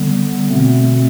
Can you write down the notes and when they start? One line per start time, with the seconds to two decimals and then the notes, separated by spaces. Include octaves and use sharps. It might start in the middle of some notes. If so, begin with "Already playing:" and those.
Already playing: D3 G3 B3
0.49 B2 A3 C4